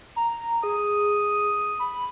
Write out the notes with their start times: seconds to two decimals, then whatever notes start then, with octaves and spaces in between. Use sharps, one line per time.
0.16 A#5
0.63 G#4 D#6
1.79 B5